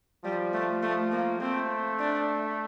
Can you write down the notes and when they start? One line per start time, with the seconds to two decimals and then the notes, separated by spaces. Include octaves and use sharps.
0.24 F3 G3
0.53 A3
0.83 A3
1.12 A#3
1.41 A3 C4
2.00 D4